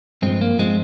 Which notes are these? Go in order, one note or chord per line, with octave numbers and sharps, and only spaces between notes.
G2 F3 G#3 C4
A#3
G2 F3 G#3 C4